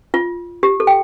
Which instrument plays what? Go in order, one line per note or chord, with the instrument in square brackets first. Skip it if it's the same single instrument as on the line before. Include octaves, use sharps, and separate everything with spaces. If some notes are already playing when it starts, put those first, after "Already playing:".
[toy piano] F4
G4
A4
G5